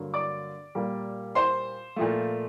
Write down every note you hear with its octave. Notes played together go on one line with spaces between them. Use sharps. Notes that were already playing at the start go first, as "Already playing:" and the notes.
Already playing: G2 D3 F#3 A#3
D5 D6
A#2 G3 A#3
C5 C6
A#2 F3 A3